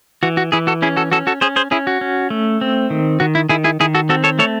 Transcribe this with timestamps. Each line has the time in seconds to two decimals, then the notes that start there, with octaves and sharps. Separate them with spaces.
0.23 E3 F#4
0.37 F#4
0.52 E3 E4 G#4
0.67 F#4 A4
0.82 C#4 E4 G#4
0.97 F#4 A4
1.12 C#4 F#4 A4
1.27 F#4 A4
1.41 C#4 G#4 C5
1.56 G#4 C5
1.71 C#4 E4 G#4
1.87 F#4
2.01 C#4
2.30 A3
2.61 C4
2.90 D#3
3.20 D#3 F#4
3.35 E4
3.49 D#3 E4 G#4
3.64 E4 G#4
3.80 D#3 E4 G#4
3.95 F#4 A4
4.09 C4 F#4 A4
4.24 A4 C#5
4.39 A3 A4 C#5